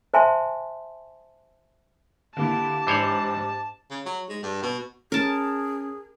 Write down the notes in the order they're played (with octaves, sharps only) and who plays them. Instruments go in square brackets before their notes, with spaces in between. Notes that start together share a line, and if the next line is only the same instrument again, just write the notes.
[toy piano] C5 E5 F5 G#5 A5 C6
[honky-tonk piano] D3 A#3 E4 [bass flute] G4 [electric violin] A5
[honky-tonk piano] G#2 D4 F#7 [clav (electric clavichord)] E3 C5 C#5
[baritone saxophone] C#3
F#3
G#3
G2
B2
[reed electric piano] C#4 [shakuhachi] G#4 [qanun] A#4 A5